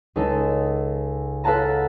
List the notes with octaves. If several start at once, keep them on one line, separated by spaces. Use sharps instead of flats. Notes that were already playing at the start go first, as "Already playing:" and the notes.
C#2 D#4 A4
A4 B4 F5 F#5 A5 A#5